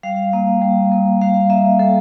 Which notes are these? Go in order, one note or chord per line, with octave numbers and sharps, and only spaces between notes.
G3 F5
A#3
G3
A#3
G3 F5
A#3 E5
G3 A4